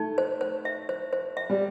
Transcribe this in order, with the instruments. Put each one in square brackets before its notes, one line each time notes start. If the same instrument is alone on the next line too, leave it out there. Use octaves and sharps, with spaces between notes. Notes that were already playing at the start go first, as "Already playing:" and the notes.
Already playing: [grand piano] A3 [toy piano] D#4
[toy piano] C5
C5
E5
C5
C5
E5
[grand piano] G3